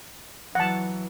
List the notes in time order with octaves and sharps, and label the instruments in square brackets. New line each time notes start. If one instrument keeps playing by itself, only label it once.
[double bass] E3 F#3 [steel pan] F#5 A5